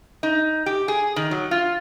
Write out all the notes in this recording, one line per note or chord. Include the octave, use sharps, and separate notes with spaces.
D#4
G4
G#4
D#3
F#3
F4